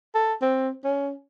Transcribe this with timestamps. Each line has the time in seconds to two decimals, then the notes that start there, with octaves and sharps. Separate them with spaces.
0.15 A4
0.42 C4
0.84 C#4